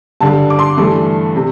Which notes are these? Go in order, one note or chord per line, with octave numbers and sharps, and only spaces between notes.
G2 D3 G3 A5
D6
C6
G2 E3 A3
C3